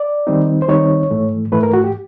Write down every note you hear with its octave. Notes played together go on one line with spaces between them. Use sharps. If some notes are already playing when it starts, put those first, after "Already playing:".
Already playing: D5
D#3 G3 C4 D#4
C5
D#3 G3 C4 D#4 C#5
G#2 E3 A3
G#2 E3 A3 B4
A#4
F#4
G4